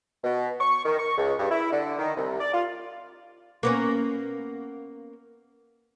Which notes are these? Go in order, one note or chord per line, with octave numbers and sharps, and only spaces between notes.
B2
C#6
D#3
C#6
C#2
G2
E4
D3
D#3
C2
D5
F4
A#3 B3 C#4